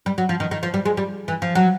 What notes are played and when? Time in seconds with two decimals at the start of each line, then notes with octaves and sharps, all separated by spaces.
0.06 G3
0.18 F#3
0.29 F3
0.40 D#3
0.51 D#3
0.63 F3
0.74 G3
0.85 G#3
0.97 G3
1.28 E3
1.42 F3
1.55 F#3